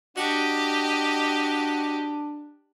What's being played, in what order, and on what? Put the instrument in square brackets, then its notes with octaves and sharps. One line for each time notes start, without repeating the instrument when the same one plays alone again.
[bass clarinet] D4 [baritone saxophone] F#4 [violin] G4 D#5